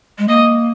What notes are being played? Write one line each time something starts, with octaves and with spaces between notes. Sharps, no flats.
G#3
A#3 D#5